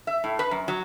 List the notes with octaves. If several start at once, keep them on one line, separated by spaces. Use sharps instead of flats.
E5
A2
B4
F#2
F#3